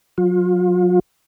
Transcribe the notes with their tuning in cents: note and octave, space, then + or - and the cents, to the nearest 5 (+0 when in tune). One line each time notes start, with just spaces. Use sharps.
F#3 -25 F4 +35